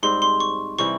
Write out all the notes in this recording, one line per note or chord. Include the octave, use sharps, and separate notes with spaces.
G#2 G3 C4 C6
C6
C#6
C3 E3 G3 C#6